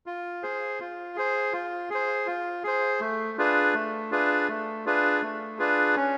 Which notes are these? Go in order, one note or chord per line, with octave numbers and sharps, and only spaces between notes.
F4
G#4 C5
F4
G#4 C5
F4
G#4 C5
F4
G#4 C5
A3
D4 F4 G#4 B4
A3
D4 F4 G#4 B4
A3
D4 F4 G#4 B4
A3
D4 F4 G#4 B4
C#4